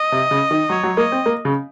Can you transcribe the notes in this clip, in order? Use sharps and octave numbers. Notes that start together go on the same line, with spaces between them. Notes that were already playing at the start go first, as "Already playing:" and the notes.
Already playing: D#5
C3
C#3
D#3
F#3 C#5
F#3
A#3 D#5
C4
A#3
C#3